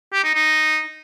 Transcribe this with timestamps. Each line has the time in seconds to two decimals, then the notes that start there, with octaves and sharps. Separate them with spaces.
0.13 G4
0.24 D#4
0.35 D#4